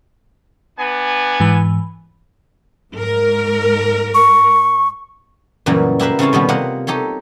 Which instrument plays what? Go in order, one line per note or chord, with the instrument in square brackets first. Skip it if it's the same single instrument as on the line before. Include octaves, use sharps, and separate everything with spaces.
[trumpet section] B3 D4 G#5
[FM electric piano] G#2 E3 B5
[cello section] G#2 A#4
[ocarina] C#6
[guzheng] F#2 A#2 C#3 E3 G3
E4 G4 A#4 B4 E5 F5
C#3 C4 C#4 E4 A4 A5
B2 D#3 G3 B3
C3 A#3 F4 G4 D#5 F#5
D#4 G4 A4 C#5